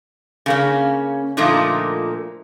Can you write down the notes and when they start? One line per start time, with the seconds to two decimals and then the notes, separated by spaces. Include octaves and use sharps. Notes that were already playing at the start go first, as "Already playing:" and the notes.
0.46 C#3 A#3 C#4
1.37 A#2 D3 F3 A3 A#3 D#4